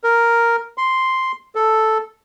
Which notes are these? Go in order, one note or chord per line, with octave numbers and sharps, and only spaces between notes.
A#4
C6
A4